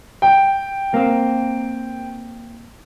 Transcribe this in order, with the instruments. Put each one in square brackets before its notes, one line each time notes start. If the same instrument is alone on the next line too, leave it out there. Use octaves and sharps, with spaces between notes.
[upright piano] G5
[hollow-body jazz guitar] A#3 C4